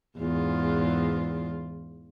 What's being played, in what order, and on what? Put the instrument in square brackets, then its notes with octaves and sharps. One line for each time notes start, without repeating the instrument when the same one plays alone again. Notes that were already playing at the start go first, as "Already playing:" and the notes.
[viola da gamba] E2 G#2 F4